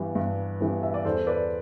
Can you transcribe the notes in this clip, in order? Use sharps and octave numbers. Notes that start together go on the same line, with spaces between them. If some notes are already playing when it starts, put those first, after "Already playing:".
Already playing: G2 E3 G3 B3
G2
E3 G3 B3
E5
D5
E2 A4 C5
B4 D5